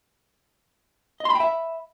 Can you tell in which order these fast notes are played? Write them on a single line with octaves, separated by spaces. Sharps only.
D#5 C6 B5 G5 E5